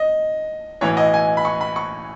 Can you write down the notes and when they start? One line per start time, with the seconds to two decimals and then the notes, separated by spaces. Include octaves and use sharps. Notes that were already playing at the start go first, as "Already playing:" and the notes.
Already playing: D#5
0.81 B1 A2 E3 C#5
0.97 D#5
1.14 G#5
1.37 B5
1.45 C#6
1.61 B5
1.76 C#6